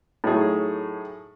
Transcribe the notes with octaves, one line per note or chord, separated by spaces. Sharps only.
A2 F#3 D#4 G#4